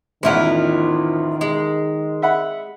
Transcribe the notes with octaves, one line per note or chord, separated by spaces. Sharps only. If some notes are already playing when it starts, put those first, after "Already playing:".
A1 E2 D#3 F3 E4 F4 F#5
G#3
E5 F#5 B5